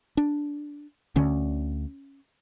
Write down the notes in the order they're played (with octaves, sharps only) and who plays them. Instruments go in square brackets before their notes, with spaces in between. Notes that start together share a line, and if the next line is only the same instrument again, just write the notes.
[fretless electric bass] D4
D2 D3 C#4